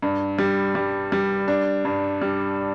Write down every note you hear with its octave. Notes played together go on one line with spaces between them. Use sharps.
G2
G3
G3
G3
D4
G2
G3